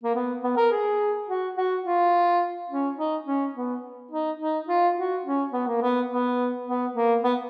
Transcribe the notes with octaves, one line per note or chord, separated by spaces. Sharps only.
A#3
B3
B3
A#4
G#4
F#4
F#4
F4
C#4
D#4
C#4
B3
D#4
D#4
F4
F#4
C#4
B3
A#3
B3
B3
B3
A#3
B3